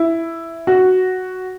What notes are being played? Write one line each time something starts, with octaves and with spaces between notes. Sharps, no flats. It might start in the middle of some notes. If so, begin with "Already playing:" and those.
Already playing: E4
F#4